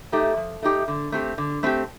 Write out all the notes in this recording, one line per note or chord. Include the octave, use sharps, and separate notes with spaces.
A3 D#4 G4
F3
A3 D#4 G4
D3
A3 C4 G4
D3
A3 C4 G4